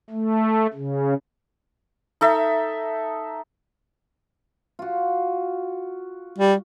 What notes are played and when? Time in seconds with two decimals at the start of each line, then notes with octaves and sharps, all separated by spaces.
0.10 A3
0.74 C#3
2.21 D#4 A4 E5
4.79 F4 F#4
6.38 G3